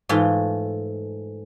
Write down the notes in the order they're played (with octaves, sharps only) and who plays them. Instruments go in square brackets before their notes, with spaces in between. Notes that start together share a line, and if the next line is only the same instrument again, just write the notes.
[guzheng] G#2 E3 A3 F4 G5